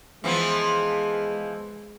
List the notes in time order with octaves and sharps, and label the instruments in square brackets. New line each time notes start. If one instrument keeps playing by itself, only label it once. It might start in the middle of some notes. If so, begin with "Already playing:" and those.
[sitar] E3 F3 B3 [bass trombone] G#3